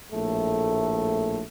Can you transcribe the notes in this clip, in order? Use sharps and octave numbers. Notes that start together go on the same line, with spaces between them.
A#1 A2 A3